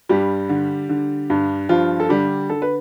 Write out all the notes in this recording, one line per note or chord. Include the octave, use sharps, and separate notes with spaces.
G2 G3 G4
D3
D3
G2
G2 F3 F4
A4
D3 G3 G4
D3 A4
B4